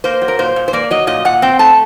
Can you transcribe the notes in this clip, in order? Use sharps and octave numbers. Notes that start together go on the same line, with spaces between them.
A#3 C5
F#3
A#4
A#2 C5
A#2
C5
A#3 D5
F#3 D#5
A#2 D#5
A#2 F#5
C4 G5
A3 A5